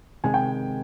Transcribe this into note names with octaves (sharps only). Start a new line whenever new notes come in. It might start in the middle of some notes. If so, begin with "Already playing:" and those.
C3 D#3 G#3 G#5
G5